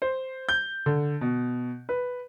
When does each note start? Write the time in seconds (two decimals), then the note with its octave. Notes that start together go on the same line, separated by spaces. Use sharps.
0.02 C5
0.49 G6
0.86 D3
1.21 B2
1.89 B4